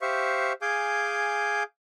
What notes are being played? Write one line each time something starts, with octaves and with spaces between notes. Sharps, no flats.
G4 C5 E5 F5 C#6
G#4 F5 G#5 D6 G6